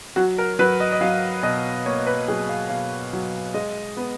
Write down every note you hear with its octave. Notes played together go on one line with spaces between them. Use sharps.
F#3 F#4
A#4
F#3 B4
D#5
D#5
F#3 F5
B2 D#5
A#3 C#5
B4
F#3 G#4
F5
B2 F5
F#3
G#3 D#5
B3